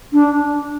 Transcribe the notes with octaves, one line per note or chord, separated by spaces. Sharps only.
D4